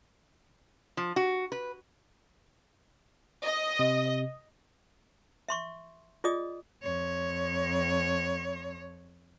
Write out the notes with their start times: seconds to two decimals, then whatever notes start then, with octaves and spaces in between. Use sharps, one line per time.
0.97 F3
1.16 F#4
1.52 B4
3.44 D#5
3.79 C3
5.48 E5 C6 C#6
6.24 F4 G#4 D5 D#5 D#6
6.83 F2 C#5